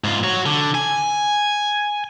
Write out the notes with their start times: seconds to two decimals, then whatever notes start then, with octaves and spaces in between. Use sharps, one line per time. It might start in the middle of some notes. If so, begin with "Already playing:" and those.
0.04 G#2 F4
0.24 F#4 C#5
0.46 D3
0.75 G#5